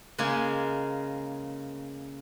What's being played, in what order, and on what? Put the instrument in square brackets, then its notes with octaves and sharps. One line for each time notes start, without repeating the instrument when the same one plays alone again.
[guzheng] C#3 G#3 A#3 G#5